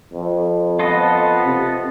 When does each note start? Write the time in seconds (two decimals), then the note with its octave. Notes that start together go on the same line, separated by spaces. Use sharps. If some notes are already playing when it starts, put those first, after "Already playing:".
0.13 F2
0.79 B3 F4 A4 D#5
1.46 C3